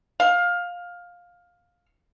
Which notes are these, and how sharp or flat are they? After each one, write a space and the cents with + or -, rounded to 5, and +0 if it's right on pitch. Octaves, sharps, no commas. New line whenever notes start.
F5 +15